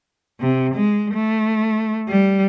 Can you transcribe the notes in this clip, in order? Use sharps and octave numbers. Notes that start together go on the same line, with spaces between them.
C3
G#3
A3
G3